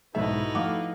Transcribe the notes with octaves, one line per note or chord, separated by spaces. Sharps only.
B1 G#2 B3 D#4 E4 F#4 A4 E5
F3 A3 F5 F#5 D6